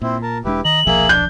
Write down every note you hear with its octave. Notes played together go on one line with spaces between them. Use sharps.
A#2 C4 E4
A#4 A5
E1 G#3 D4 E4 G4 B4
D#3 D#5 A#5 F#7
D#1 B1 F3 A#3 G#4 E5
D4 G6